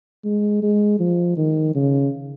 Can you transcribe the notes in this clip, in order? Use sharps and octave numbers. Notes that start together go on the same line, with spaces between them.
G#3
G#3
F3
D#3
C#3